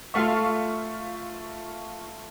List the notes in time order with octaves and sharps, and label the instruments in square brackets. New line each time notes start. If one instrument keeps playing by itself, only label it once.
[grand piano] A3 E5 [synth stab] F4 F5 C#6